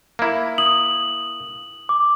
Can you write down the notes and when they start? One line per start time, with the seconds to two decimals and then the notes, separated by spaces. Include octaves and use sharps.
0.19 A#3 E4
0.58 D#6 F#7
1.89 D6